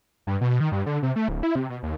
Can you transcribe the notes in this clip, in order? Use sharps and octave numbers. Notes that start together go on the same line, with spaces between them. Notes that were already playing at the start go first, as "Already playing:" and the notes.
G2
B2
D#3
G2
D3
C3
A3
D1
E4
C3
B2
D#2